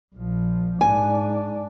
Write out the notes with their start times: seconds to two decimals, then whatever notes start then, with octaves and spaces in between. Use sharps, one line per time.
0.15 A#1 F3
0.81 G#2 D4 G#5